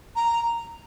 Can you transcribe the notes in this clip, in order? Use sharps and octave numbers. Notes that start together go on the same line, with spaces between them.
A#5